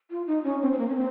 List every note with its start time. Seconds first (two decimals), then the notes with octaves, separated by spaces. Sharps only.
0.10 F4
0.27 D#4
0.44 C#4
0.62 C4
0.72 C4
0.78 A#3
0.89 C#4
0.95 C4